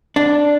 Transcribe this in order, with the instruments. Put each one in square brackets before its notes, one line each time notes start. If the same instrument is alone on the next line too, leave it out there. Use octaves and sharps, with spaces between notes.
[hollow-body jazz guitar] D4